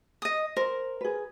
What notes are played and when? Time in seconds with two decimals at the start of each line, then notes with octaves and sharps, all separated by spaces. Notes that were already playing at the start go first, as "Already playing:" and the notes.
0.22 D#5 D#6
0.57 A#4 C5
1.01 G#4 B4